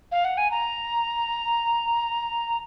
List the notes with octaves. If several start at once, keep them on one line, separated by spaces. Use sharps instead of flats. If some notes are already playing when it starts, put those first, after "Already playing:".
F5
F#5
G#5
A#5